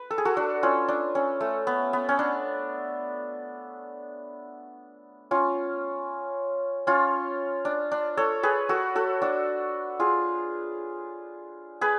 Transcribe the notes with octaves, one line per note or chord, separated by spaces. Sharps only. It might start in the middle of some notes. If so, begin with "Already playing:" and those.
Already playing: B4
A4
G#4
F#4 A4
D4 F#4
C#4 F4
D4
C#4
A3
B3
B3
C#4
D4
C#4 F4
C#4 F4
D4
D4
A4 C#5
G#4 B4
F#4 A4
F#4 A4
D4 F#4
F4 G#4
G#4 B4